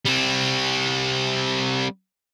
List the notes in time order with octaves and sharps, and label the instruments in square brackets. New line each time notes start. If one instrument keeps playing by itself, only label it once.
[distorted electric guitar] G3 C4